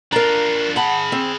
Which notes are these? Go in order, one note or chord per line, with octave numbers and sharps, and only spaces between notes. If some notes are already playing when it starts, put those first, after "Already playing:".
D4 F4 A#4 A#5
G#4 F#5 A5 B5
C4